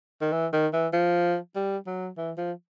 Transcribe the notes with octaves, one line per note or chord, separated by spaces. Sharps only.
D#3
E3
D#3
E3
F3
G3
F#3
E3
F3